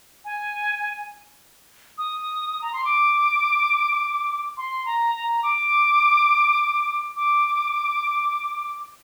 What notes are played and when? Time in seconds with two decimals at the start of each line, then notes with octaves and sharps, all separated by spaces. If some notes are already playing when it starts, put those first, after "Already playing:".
0.25 G#5
1.98 D#6
2.62 A#5
2.73 C6
2.85 D6
4.57 C6
4.86 A#5
5.15 A#5
5.43 D6
7.16 D6